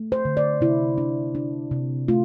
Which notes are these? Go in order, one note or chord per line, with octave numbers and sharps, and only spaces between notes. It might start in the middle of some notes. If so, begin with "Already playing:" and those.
Already playing: A3
C5
D3
D5
C3 E4
D4
D4
C3
A3 F4